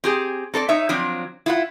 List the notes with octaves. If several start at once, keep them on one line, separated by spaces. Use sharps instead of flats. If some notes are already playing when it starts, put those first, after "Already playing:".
C4 G4 G#4
C4 A4 C5 D5
D#4 C#5 E5
F3 F#3 C4 D4
E4 F4 F#5